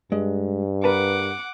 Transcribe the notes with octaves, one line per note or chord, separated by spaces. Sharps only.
G2 G#3
A#4 B4 F#5 A5 D6